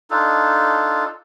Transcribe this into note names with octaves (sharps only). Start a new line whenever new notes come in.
D4 D#4 F4 A4